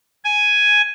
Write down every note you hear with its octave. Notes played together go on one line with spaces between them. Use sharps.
G#5